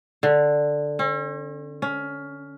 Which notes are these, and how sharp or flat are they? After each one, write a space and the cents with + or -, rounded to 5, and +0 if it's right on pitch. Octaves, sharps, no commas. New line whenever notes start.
D3 +5
C#4 -45
C#4 +20